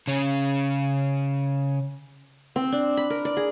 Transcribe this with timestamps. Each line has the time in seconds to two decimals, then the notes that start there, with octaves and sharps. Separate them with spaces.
0.07 C#3 C#4
2.56 C4
2.72 D4
2.97 B5
3.10 A#4
3.25 D5
3.37 G#4